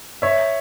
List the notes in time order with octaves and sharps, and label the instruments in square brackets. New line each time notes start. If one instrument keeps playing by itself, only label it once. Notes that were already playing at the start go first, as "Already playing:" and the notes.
[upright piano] C#5 E5